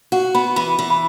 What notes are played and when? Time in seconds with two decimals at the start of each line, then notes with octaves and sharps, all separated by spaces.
0.12 F#4 F#5
0.35 B3 B5
0.56 E3 B5
0.79 E3
0.90 B5